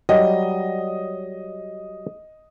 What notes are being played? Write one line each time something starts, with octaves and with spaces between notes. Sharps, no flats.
F#3 G3 D#5